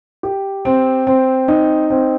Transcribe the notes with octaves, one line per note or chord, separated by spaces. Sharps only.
G4
C4
C4
D#4
C4